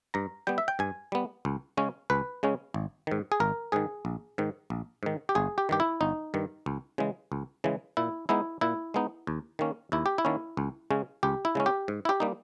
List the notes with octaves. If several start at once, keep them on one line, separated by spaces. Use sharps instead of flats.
G2 A#5
G3 B3 G5
E5
G5
G2 G#5
G3 B3
C#2
C#3 G#3 C#4
C#2 B4
C#3 G#3 C#4
G#1
G#2 D#3
G#4
G#1 A#4
G#2 D#3 G#4
A#1
G#2 D#3
A#1
G#2 D#3
G4
G1 G#4
G4
G2 D#3 G4
E4
G1 D#4
G2 D#3
C#2
C#3 E3 G#3
C#2
C#3 E3 G#3
A#2 E4
G#3 B3 D#4 E4
A#2 E4
G#3 B3 D#4
D#2
D#3 A#3 C#4
D#2 E4
G4
E4
D#3 A#3 C#4
C#2
C#3 G#3 C#4
C#2 G4
E4
C#3 G#3 C#4
G4
G#2
E4
G4
G3 A#3 D#4